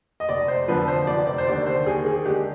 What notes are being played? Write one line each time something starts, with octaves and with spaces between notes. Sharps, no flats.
D#5
F1 D5
C5
F2 D3 F3 B4
C5
F1 D5
D5
C5
D#2 D3 D5
C5
D#2 G#4
G#4
D3 G#3 G4